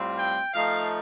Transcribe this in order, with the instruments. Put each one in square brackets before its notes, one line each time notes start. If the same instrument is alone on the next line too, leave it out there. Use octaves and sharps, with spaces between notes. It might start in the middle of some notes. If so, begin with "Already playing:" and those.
Already playing: [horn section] A2 G3 C4 F4
G5
F3 A3 D#4 F5